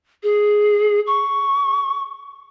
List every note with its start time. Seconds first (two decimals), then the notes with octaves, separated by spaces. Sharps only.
0.23 G#4
1.07 C#6